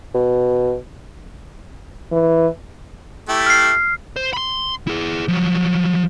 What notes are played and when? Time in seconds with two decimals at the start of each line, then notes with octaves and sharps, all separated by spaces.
0.15 B2
2.12 E3
3.29 A3 E4 G4
3.46 F6 C7
4.16 C5
4.33 B5 C6
4.87 E4 G#4
5.28 F3 F#3